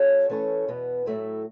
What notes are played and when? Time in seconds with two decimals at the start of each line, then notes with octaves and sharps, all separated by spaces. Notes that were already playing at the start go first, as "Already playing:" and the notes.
Already playing: F#3 C#4 F#4 A4 C#5
0.30 E3 A3 C#4 A4 C#5
0.68 E2 B2 B3
1.06 A2 F#3 A3 E4